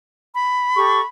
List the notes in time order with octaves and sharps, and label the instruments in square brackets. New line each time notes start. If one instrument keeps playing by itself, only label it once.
[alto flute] B5
[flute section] G4 A4 C#6